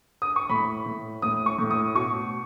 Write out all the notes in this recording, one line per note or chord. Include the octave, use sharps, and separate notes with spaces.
D#6
C#6
A2 B5
A2
A2 D#6
C#6
A2
D#6
B2 C#6